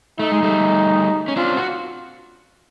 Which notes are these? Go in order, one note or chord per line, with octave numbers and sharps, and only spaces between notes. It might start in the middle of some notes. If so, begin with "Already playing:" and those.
A3 D#4
G#3
G3 A3
C#4
C4 D4 F4
F#4